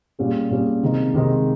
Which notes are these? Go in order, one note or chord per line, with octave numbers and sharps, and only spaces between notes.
A#2 G3 C#4 G#4
A#2 G3 C#4 G#4
C3 D#3 G#3 D#4
C3 D#3 G#3 D#4